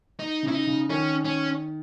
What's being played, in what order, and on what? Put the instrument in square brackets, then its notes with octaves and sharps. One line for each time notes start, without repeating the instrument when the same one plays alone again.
[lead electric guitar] D#4
[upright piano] C#3
[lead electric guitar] E4
D#4
[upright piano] C#3
[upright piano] D#3 [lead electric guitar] C#4
[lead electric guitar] C#4